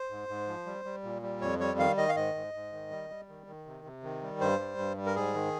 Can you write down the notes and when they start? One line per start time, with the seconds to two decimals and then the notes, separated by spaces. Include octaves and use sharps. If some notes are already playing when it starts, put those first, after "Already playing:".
Already playing: C5
0.10 G#2
0.29 G#2
0.47 F3
0.66 G3
0.85 G3
1.03 A#2
1.22 G3
1.41 F2 C#5
1.60 G3 C#5
1.78 D#3 F5
1.97 D#3 D#5
2.09 F5
2.15 G#2 D#5
2.35 G#2
2.54 G#2
2.72 D#3
2.91 G3
3.10 G3
3.28 D#3
3.47 D#3
3.66 C3
3.84 C3
4.03 D#3
4.22 G3
4.41 G2 C5
4.60 G3
4.78 G2
4.97 G3
5.06 A#4
5.15 G#2 G#4
5.34 D#3